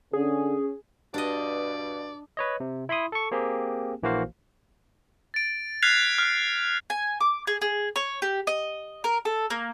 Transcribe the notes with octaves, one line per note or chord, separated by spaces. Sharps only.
D3 C#4 G#4
G2 B2 D4 D5 D#5
B4 C#5 D#5
C3
E4 B5 C6 D#6
A4 C#6
A#3 C4 G4 G#4
A#1 E3 A#3 F#4 C5 F5
A6 D7
F6 F#6 G#6 B6 C7 F7
F6 F#6
G#5
D6
G#4
G#4
C#5
G4
D#5
A#4
A4
A#3